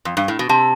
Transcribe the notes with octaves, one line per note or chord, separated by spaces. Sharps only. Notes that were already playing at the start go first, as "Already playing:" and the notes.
F2
G2
A2
B2
C3 A5